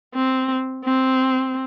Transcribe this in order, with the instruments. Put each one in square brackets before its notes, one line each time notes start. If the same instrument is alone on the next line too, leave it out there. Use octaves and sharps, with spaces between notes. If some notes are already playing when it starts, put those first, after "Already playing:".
[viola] C4
C4